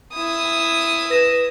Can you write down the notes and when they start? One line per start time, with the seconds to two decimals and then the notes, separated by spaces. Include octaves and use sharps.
0.13 E4 D#6
1.10 B4 A#6 E7